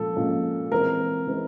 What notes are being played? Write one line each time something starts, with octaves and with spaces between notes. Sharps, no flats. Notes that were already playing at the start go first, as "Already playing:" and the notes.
Already playing: A#2 F3 G#3 C#4 F4 A4
A#2 F3 G#3 C#4 F4
E3 G#3 C4 A#4
E3 G#3 C4